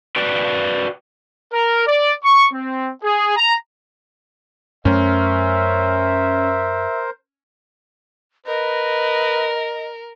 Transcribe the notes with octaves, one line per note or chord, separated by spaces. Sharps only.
F#4 B4 D5 G5
A#4
D5
C#6
C4
G#4
A#5
F#2 A3 C#4 A#4 C5 E5
A#4 B4 D#5